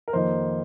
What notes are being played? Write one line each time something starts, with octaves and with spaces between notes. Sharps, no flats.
A#4
F2 D#3 A#3 D#4 C5